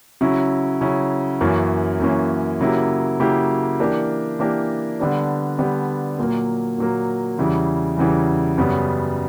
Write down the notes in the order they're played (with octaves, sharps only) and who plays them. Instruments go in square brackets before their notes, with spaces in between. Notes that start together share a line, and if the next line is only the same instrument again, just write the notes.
[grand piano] C#3 F#3 C#4 E4
C#3 F#3 C#4 E4
F#2 E3 A#3 C#4
F#2 E3 A#3 C#4
C#3 F#3 A#3 E4 G4
C#3 F#3 A#3 E4 G4
E3 A#3 D4 G4 A#4
E3 A#3 D4 G4 A#4
D3 G3 B3 D4 G4
D3 G3 B3 D4 G4
A#2 F#3 A#3
A#2 F#3 A#3
E2 C#3 E3 G3
E2 C#3 E3 G3
F#2 C#3 G3 B3